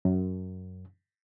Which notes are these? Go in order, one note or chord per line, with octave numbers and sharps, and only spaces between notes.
F#2